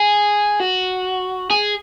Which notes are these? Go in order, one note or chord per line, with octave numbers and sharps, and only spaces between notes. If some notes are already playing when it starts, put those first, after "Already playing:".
Already playing: G#4
F#4
G#4